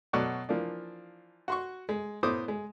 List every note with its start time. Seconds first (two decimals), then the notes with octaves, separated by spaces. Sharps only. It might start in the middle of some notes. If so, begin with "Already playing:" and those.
0.13 B2 F#3 A4 D5 F#5 C#6
0.49 E3 F3 A#3 D4
1.48 F#4 C6 C#6
1.89 G#3
2.23 A2 B3 C5 D6 D#6
2.48 G#3